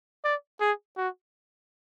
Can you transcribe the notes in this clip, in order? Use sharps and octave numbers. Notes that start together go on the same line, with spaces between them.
D5
G#4
F#4